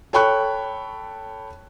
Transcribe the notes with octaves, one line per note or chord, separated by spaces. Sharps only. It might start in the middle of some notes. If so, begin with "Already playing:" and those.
A4 C#5 G5 B5 C#6 F#6